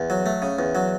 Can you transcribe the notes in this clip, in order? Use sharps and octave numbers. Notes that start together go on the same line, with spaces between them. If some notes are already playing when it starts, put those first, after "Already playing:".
Already playing: E2
F#3
A3
C#3
E2
F#3